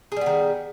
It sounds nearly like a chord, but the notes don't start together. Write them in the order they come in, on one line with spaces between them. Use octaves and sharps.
G#4 G3 B3 D#3